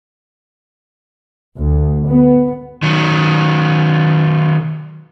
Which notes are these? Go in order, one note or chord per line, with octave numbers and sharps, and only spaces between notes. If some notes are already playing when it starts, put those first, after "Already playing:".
D2
B3
D#3 F#3